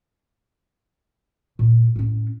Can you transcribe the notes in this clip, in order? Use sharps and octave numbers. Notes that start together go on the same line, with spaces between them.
A#2
A2 C#4